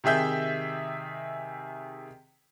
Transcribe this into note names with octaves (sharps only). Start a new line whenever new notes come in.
C3 D#3 G#4 E5 G6